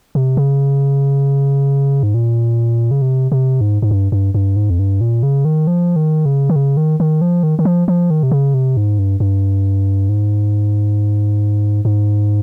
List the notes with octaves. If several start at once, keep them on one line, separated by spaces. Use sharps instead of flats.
C3
C#3
G#2
A#2
C#3
C3
C3
G#2
G#2
G2
G2
G2
G#2
F2
G2
A#2
C#3
D#3
F3
D#3
C#3
D#3
C#3
D#3
D#3
F3
D#3
D#3
F3
F3
D#3
C3
C#3
C3
G#2
G2
G2
G#2
G#2